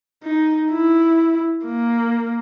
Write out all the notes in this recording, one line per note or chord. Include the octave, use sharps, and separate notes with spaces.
D#4
E4
A#3